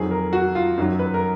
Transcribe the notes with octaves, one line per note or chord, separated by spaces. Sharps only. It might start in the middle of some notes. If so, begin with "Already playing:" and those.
Already playing: F2 D#3 F#3 G#4
A#4
F#4
F4
F#2 D#3 F#3
B4
A#4